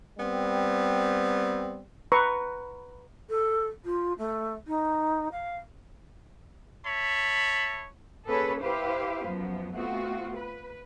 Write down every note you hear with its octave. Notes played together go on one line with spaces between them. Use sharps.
G3 B3 C4
B4 A#5 C#6
A4
F4
A3
D#4
F5
C#5 E5 A5 B5
A#3 C#4 G#4 A4 B4 C#5
E4 G4 B4 C5 F5
F#2 F3 B3
A3 B3 C4 F4 F#4
B4